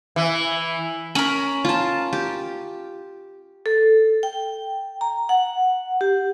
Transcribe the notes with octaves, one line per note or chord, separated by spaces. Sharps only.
E3
C#4 A#4 B5
F4 A5
G4
A4
G5
A#5
F#5
G4